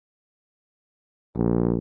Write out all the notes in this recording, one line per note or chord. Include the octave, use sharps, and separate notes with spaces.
A#1